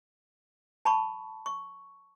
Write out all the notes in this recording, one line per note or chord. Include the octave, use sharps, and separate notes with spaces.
A5 B5 C#6
C#6